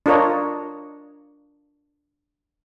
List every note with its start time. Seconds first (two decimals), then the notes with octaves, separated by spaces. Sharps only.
0.06 D4 F4 A#4 C#5 D#5